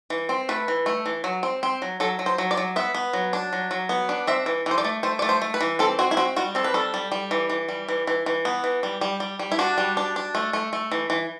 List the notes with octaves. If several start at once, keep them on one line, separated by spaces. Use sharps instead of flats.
E3
C4
A3 B4
E3
A3
E3
F#3
C4
C4
F#3
F#3 A4
F#3
C5
F#3
D5
F#3
B3 E5
B3
F#3
D4
F#3
F#3
B3
D4
C4 E5
E3
E3 C5
D5
A3
A3 C5
A3 D5
C5
A3
B4
E3
C4 A4
C4 F#4
E4
C4 F#4
G3 F#4
C4 A4
B4
G3 A4
G3
G3
E3
E3
G3
E3
E3
E3
B3
E3
G3
G3
G3
G3
E4
D4 F#4
G3
D4
D4
A3
A3
A3
E3
E3